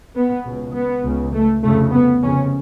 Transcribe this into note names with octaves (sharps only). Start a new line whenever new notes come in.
B3
C#2 B2
B3
C#2 C#3
A3
F1 F2 C#3 A3
B3
F1 F2 C#3 C#4